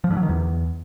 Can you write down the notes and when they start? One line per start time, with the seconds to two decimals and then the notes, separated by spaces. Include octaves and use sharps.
0.04 F3
0.10 G2
0.17 F#3
0.23 D#3
0.29 E2